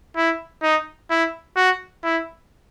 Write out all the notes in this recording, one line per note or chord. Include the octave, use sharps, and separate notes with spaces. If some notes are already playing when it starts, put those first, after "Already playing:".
E4
D#4
E4
F#4
E4